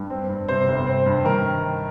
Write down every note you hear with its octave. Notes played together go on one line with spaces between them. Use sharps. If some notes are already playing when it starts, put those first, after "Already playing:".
Already playing: G2
C4
G2
C3 C5
G1
C4
G2
D#3 A#4